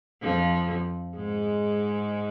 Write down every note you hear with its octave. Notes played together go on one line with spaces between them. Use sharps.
F2 F3
G#2 G#3